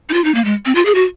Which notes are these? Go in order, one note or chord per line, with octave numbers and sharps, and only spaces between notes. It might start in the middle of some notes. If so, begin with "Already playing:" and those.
D#4
F4
D#4
A#3
G#3
C4
F4
G#4
F#4